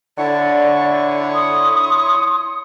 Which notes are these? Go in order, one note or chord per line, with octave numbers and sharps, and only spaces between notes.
D3 E4 C#5 D5 C#6
C6 D#6